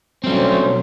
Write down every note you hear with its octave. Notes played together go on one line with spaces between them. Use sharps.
D2 B2 F#3 G3 C4 C#4 C5